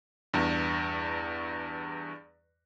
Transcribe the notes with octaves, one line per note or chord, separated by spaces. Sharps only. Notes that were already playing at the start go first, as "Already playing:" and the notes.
E2 G2